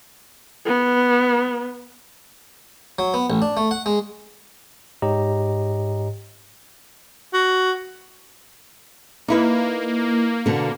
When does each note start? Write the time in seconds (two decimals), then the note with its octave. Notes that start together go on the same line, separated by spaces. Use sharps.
0.65 B3
2.99 F#3
3.14 B3
3.30 A1
3.42 D4
3.57 A3
3.71 F#5
3.86 G#3
5.02 G#2 G4 C#5 D#5 A#5
7.33 F#4
9.28 A#3 D#4 E4 B4
10.46 B2 D3